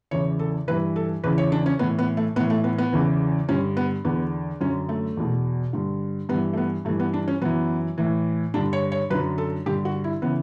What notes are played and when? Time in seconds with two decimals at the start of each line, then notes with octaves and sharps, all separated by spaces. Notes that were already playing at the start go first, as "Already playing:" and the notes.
0.11 E2 C#3 E3 C#5
0.39 A4
0.68 G2 E3 B4
0.96 A4
1.24 E2 C#3 E3 B4
1.38 C#5
1.52 D4
1.66 C#4
1.79 A2 E3 B3
1.99 B3
2.17 A3
2.36 A2 B3
2.40 E3
2.50 A3
2.64 B3
2.78 B3
2.93 E2 C#3 E3
3.49 G2 D3 C#4
3.77 B3
4.05 E2 D3 B3
4.61 F#2 D3 C#4
4.89 A3
5.17 E2 B2
5.73 G2 D3
6.29 G2 B3
6.33 E3
6.53 A3
6.57 B3
6.85 G2 A3
6.89 E3
7.00 B3
7.13 D4
7.28 C#4
7.42 F#2 E3 B3
7.98 A2 E3
8.54 G2 D3 D4
8.73 C#5
8.92 C#5
9.10 F#2 B4
9.15 D3
9.38 A4
9.66 G2 D3 G4
9.85 F#4
10.04 E4
10.22 C#3 E3 B3